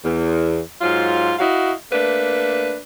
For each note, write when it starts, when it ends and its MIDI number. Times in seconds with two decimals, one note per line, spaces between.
0.03 0.61 40
0.82 1.33 44
0.82 1.33 54
0.82 1.33 65
1.39 1.72 64
1.39 1.72 66
1.39 1.72 75
1.39 1.72 77
1.92 2.77 57
1.92 2.77 58
1.92 2.77 62
1.92 2.77 71